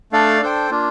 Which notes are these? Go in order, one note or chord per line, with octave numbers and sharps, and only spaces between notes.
A3 D4 A4 D5 F5
D4 A4 C5 G5
A#3 D4 F4